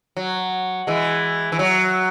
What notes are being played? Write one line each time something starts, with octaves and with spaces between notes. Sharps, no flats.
F#3
E3 G#3
E3
F#3